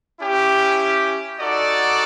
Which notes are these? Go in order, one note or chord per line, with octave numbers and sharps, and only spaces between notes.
C#4 E4 G4
D#4 F#4 A4 D5